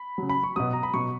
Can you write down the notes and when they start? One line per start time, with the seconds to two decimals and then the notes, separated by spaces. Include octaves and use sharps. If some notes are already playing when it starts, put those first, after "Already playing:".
Already playing: B5
0.18 C#3 F#3
0.29 B5
0.43 C#6
0.56 B2 F#3 D#6
0.73 A#5
0.83 B5
0.93 B2 F#3 C#6